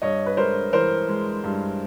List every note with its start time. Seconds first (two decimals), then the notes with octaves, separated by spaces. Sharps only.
0.02 G2 C#5 D#5
0.26 B4
0.37 G#3 A#4 C5
0.73 E3 A#4 C5
1.09 G#3
1.44 G2